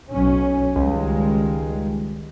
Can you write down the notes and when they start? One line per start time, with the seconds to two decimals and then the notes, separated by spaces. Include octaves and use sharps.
0.11 B1 F#3 C#4
0.76 C#2 D#3 G3 G#3